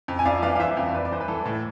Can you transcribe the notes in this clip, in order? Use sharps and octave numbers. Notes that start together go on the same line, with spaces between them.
F2
G#5
F2 D5 F5
E3 D5 F5
F5
E3 C5 E5
F2
F2 B4 D5
D5
E3 C5
B4
E3 A4
A2